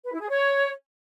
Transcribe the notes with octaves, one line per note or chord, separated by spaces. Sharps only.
B4
E4
G#4
C#5